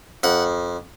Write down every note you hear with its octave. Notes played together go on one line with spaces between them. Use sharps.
F2 F#5